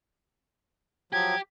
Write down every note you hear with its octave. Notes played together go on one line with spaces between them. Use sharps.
F3 F#3 G4 G#6